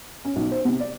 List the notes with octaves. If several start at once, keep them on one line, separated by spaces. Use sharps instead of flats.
C#4
B1
C5
C3
D5